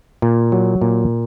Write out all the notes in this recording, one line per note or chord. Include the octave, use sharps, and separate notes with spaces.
A#2
F#3
A#2